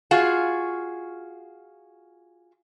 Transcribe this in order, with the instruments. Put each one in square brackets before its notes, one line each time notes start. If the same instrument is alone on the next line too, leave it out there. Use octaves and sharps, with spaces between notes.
[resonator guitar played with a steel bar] F4 F#4 G#4